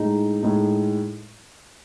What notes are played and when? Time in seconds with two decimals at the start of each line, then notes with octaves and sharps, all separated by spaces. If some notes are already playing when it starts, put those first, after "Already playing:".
Already playing: A2 G#3 D#4
0.43 A2 G#3 D#4